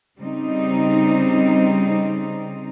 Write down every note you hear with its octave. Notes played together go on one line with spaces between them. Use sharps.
C#3 G3 C4 D#4